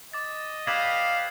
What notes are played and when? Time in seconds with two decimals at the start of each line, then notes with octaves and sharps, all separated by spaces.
0.13 D#5 D6 A6
0.67 G4 B4 D5 F5 G#6 E7 F#7